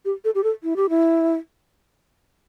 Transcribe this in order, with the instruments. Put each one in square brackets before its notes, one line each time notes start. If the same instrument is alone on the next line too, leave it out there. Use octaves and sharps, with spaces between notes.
[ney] G4
A4
G4
A4
E4
G4
E4